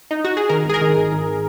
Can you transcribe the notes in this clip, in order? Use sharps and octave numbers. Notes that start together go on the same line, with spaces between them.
D#4
F#4
G#4
D#3 A#4
G#1 G#4
A#4
D#3
G#1
G#1